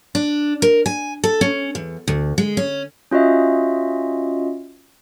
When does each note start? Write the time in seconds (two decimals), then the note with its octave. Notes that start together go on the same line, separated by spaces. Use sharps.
0.15 D4
0.62 A#4
0.86 G#5
1.24 A4
1.41 C#4
1.75 E2
2.08 D2
2.38 G#3
2.57 C#4
3.11 C#4 F4 F#4 D#5 E5